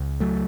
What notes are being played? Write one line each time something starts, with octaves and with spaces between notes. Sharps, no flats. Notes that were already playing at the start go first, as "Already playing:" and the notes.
Already playing: C#2
F#3 A3